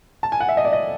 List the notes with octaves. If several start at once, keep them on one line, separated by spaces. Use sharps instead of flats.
A5
G#5
F#5
E5
D#5
D5
D#5